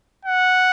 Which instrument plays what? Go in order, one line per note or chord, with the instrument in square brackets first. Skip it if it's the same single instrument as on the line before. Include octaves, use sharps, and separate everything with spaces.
[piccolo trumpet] F#5